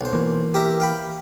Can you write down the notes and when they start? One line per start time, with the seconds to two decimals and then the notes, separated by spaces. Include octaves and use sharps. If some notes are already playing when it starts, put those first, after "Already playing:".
0.01 B1 C5
0.13 E3 A#3
0.54 G4 A#4 E5
0.80 F5 G5 B5